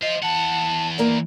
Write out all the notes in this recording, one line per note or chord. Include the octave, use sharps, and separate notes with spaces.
C5 D#5 F5
E3 F#5 A5
A#3 A#4 D5